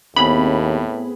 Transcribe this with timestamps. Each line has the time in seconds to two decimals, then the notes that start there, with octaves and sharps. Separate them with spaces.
0.16 D#2 A2 B3 C4 G#4 B5